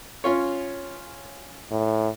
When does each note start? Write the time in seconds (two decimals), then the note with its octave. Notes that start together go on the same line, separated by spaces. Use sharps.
0.24 C#4 F4 C#5
1.71 A2